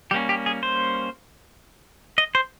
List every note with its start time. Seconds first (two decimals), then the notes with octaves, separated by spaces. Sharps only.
0.11 G3 A#3 C#4 G4
0.29 G4
0.46 G#4
0.63 C5
2.18 D#5
2.35 C5